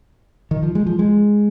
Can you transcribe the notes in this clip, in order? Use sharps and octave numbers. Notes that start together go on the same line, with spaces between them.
D#3
F3
G#3
F3
G#3